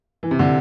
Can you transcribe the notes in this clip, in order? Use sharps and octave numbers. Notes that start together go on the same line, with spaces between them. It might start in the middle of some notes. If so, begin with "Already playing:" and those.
E3
C3
D3